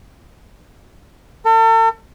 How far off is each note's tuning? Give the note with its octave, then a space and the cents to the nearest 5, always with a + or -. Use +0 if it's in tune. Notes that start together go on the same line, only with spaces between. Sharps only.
A4 +40